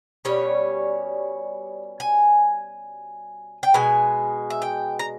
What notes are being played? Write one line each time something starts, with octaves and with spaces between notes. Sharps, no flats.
B2 G3 C#4 C#5
G#5
G5
B2 G#3 G#5
E5
G5
A#5